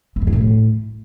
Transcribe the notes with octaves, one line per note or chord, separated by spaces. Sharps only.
E3
F2
E2
A2